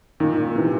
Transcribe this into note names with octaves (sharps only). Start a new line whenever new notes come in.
A#2 D#3
A#2
C3 E3